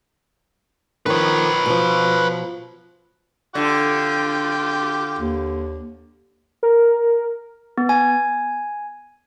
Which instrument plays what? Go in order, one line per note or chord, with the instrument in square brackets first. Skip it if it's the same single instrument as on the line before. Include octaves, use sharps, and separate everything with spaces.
[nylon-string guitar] D#3 F3 [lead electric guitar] B4 C#5
[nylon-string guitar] B2 F3
[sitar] D3 [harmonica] F4 G5 D6
[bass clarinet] D#2
[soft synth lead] A#4
[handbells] B3
G#5